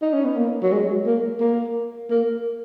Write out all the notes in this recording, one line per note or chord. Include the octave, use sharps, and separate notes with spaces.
D#4
C#4
B3
A#3
F#3
G#3
A#3
A#3
A#3